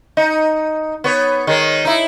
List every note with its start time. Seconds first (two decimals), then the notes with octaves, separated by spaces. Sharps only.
0.17 D#4
1.04 B3 C#5
1.47 D#3 G#3
1.85 D#4 E4